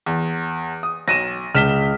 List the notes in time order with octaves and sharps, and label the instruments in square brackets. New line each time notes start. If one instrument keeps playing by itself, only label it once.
[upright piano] E2
D#6
[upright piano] B1 [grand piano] A#6 D#7 E7
[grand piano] C#2 E7 [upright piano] F6 B6 G7